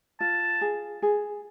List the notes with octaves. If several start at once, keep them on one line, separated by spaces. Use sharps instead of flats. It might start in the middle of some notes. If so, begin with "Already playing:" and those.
F4 A5
G#4
G#4